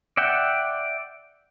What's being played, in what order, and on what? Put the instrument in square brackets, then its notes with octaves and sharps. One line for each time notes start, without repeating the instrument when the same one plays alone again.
[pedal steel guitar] D5 E5 F#5 G5